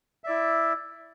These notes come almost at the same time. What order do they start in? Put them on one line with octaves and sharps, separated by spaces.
E5 D5 E4